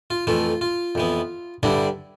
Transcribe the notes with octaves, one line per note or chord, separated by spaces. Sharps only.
F4
F2 E3 A3 F4
F4
F2 E3 B3
G2 D3 G3 D4 E4